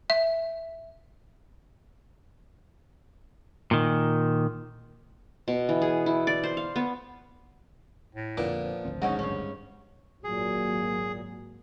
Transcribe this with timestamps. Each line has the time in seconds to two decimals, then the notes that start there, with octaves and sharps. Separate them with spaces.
0.10 E5
3.71 A#2 D#3
5.48 B2
5.69 E3
5.82 G#4
6.06 E4
6.27 D5
6.44 C5
6.57 F5
6.76 B3
8.15 A2
8.37 F2 A#2 D3 A#3 B3 D6
8.64 F3
8.85 G#1 D2 C4
9.02 G#2 C#4 D#4 F#4
9.19 G2 C#4
10.24 G#1 A#2 F#3 A#3 G#4